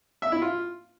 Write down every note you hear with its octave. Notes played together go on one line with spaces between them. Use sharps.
E5
E4
F4